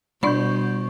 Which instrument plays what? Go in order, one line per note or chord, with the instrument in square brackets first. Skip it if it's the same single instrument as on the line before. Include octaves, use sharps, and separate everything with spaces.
[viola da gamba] B2 [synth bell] G3 C#6 G6 [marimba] D4 D5 B5